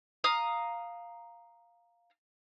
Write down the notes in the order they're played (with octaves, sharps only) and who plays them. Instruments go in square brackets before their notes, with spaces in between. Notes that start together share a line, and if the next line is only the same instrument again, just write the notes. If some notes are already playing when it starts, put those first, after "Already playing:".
[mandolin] F5 A#5 D#6